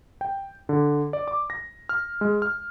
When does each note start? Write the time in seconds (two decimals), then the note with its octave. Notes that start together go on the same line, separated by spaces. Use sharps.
0.21 G5
0.69 D3
1.13 D5
1.28 D6
1.50 A#6
1.89 F6
2.21 G#3
2.42 F6